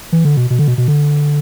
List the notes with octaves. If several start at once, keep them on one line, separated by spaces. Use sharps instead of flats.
E3
D3
B2
B2
D3
B2
B2
D3